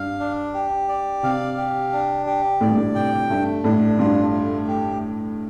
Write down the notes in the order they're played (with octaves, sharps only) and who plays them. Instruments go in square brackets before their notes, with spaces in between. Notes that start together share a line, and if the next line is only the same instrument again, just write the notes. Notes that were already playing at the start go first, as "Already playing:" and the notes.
Already playing: [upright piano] G2 [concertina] F5
[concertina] D4
G4
D5
[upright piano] C3 [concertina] F5
[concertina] G4
D4
G4
[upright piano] A2 [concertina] D5
[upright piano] G2
A2
[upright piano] C3 [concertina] G5
[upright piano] G2 [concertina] A3
[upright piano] A2 [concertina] D4
[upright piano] G2 [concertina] F4
[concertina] A3
G4